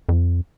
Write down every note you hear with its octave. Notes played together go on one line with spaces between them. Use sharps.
F2